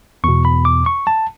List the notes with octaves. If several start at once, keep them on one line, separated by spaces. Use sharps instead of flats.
E2 B2 C#6
B5
D6
C#6
A5